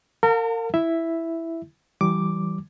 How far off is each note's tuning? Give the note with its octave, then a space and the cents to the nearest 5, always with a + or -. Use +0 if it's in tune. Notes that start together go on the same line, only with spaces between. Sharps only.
A#4 -35 F5 +40 A5 +40
E4 +0 E5 +0
E3 +0 G3 -30 D6 +0